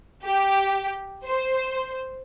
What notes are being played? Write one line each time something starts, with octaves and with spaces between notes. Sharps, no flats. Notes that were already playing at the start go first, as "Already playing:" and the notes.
G4
C5